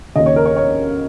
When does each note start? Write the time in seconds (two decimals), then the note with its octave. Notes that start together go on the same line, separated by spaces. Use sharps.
0.15 D#2 C#3 D#5
0.26 C#5
0.36 A#4
0.45 C#5
0.56 C#5